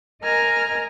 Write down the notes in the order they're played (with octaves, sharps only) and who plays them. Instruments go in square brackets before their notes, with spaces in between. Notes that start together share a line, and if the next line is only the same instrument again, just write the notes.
[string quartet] A#4 D#5 G#5 A#5 F6